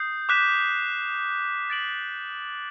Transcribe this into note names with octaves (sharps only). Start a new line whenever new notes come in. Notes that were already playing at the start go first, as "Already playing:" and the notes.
Already playing: D#6 G6 C7
D6 F#6 B6 E7
A6 D7 F#7